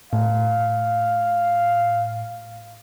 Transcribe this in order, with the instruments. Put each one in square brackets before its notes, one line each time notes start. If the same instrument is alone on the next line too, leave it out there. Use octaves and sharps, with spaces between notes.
[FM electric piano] A2 [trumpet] F5